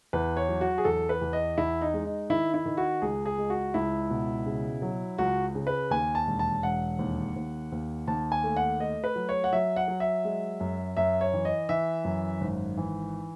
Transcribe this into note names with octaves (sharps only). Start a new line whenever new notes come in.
E2 B4
C#5
F#3
F#4
G#4
E2 A4
B4
E2
D#5
E2 E4
D#4
G#3
D#4
D#3 E4
E4
D#3
F#4
C#2 G#4
G#4
G#3
F#4
C#2 E4
B2
C#3
F#3
C#2 F#4
C#3
B4
D#2 G#5
A5
E1
A5
E1 F#5
D#2
D#2
D#2
D#2 A5
G#5
A3
F#5
A3 D#5
B4
F#3
C#5
F#5
F#3 E5
F#5
F#3
E5
G#3
F#2
F#2 E5
C#5
E3
D#5
E3 E5
F#2
G#1
E3